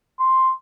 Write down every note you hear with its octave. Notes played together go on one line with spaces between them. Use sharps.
C6